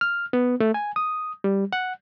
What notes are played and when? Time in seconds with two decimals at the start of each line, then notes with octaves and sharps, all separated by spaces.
0.01 F6
0.33 B3
0.60 A3
0.74 G#5
0.96 D#6
1.44 G3
1.73 F#5